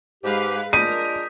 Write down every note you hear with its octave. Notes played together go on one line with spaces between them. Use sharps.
G#2 G#3 G4 B4 F5
G#3 D4 F4 A#4 D#6 G6 B6 D#7